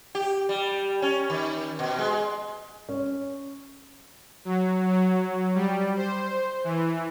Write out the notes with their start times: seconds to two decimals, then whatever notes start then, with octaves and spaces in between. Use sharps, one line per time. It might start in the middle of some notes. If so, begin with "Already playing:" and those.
0.15 G4
0.49 G3
1.02 C#4
1.30 D#3
1.79 B2
1.99 G#3
2.89 C#4
4.45 F#3
4.88 F#3
5.55 G3
5.97 C5
6.64 E3